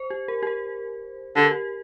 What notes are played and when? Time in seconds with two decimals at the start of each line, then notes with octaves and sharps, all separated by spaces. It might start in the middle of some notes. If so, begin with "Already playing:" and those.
Already playing: C5
0.10 G4
0.28 A#4
0.43 G4
0.47 A#4
1.36 D3 G4
1.44 A#4
1.51 G4